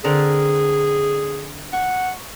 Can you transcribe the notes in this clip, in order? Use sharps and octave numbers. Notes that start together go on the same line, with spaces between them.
D3 C4 G#4 A#4
F#5 C#6